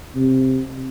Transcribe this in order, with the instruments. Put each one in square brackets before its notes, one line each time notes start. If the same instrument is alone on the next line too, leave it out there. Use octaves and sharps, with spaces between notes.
[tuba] C3